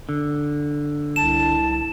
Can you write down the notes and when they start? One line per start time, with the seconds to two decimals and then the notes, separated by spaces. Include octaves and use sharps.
0.09 D3
1.16 C2 A5 E7